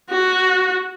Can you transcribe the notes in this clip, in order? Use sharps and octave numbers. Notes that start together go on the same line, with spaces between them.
F#4